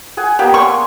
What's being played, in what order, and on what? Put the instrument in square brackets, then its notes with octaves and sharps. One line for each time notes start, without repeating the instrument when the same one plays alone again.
[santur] G#4 F#5 G#5
[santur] A#3 B3 F5 [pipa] G4
[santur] D5 C6 [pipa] C#6